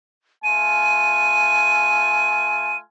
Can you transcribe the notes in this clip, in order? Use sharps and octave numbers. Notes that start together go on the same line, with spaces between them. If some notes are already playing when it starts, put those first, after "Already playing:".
A3 F4 G#5 D#7